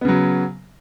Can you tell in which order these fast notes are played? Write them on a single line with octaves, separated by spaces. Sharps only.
B3 C#3 F#3